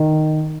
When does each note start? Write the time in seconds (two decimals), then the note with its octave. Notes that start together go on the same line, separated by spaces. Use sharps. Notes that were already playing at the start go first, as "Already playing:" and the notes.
Already playing: D#3